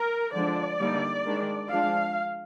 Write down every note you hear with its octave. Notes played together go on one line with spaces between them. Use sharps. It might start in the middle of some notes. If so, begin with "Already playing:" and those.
Already playing: A#4
D3 F3 G#3 D4 D5
D3 G3 A#3 D#4
D#3 G#3 D4
F3 G#3 D4 F5